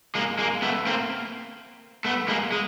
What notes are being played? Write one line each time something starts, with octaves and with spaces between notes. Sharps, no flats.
G#3 A#3
G#3 A#3
A3 B3
A#3 C4
A3 B3
G#3 A#3
G#3